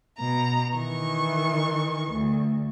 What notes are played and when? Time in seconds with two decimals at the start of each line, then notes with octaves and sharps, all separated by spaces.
0.17 B2 A#5
0.75 D#3 E3 C#6
2.11 D2